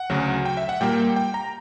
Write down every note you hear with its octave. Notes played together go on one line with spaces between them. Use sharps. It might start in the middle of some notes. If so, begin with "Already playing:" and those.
Already playing: F#5
D2 C#3 F#3
G5
E5
F#5
A#2 G3 A#3 G5
G5
A#5